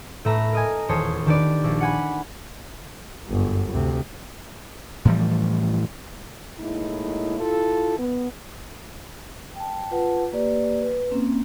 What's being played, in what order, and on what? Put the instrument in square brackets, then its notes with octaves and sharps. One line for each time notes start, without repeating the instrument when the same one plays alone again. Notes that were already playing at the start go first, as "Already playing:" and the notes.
[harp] A2 A3 B4 E5 A#5 B5
A#4 D#5 G#5
D#1 E2 C5 C#5 A5 D#6
D#3 D4 G4 B4 D5
A#1
F#5 G#5 B5
[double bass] G1 F#2
D2 C3
[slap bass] A2 E3 F3 G3
[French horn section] A2 G#3 A#3 D#4 E4
E4 F4 A4
B3
[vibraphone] G5 A5
F4 B4 F#5 A5
A#3 G4 B4 D5
B4
A#3 C4 C#4